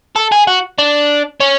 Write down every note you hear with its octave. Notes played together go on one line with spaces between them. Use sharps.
A4
G#4
F#4
D4
C#4